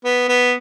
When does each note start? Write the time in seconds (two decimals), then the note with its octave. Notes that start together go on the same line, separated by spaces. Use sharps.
0.05 B3
0.28 B3